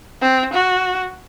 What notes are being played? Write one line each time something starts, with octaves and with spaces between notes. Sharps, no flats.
C4
F#4